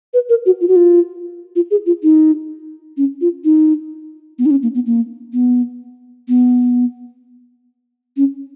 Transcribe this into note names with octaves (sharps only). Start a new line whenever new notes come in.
B4
A#4
F#4
F4
F#4
F4
F4
G#4
F4
D#4
C#4
F4
D#4
B3
D#4
C#4
A#3
B3
A#3
B3
B3
C#4